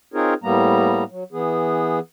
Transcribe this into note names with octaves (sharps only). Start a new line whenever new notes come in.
C4 D#4 F4 G#4 A#4 C#5
A2 G3 A#3 B3 A#5
F#3
E3 B3 G#4